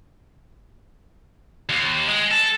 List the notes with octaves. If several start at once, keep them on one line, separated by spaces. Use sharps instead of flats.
D#2
G#3
A4